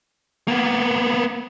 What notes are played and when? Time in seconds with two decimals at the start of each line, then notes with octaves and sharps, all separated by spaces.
0.48 A#3 B3